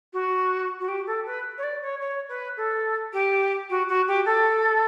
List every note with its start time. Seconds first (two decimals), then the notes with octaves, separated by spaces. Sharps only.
0.13 F#4
0.80 F#4
0.88 G4
1.06 A4
1.25 B4
1.58 C#5
1.63 D5
1.81 C#5
2.00 C#5
2.28 B4
2.56 A4
3.13 G4
3.69 F#4
3.88 F#4
4.07 G4
4.25 A4